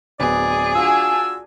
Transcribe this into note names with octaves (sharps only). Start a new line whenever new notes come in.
D1 B3 G#4 D5
D4 F4 F#4 G#5 E6